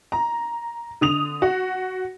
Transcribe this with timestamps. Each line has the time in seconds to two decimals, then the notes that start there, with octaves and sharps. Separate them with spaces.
0.12 A#5
1.01 D3 D#6 F7
1.42 F#4